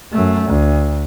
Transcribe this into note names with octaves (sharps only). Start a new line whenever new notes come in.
F#2 A3
D2